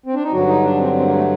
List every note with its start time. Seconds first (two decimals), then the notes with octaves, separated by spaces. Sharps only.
0.06 C4
0.14 D4
0.23 D#4
0.32 G2 D3 F#3 F#4
0.47 D#4
0.63 D4
0.78 C4
0.94 C4
1.04 A#3
1.14 A3